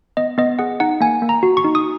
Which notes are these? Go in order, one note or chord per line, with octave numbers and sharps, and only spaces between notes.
B3 D#5
B3 D#5
G#4 F#5
D#4 F#5
A#3 G#5
A#3
A#5
F#4
C#6
D#4
D#6